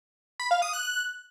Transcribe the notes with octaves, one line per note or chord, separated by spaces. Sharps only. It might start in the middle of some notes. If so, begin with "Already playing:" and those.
B5
F5
D#6
F#6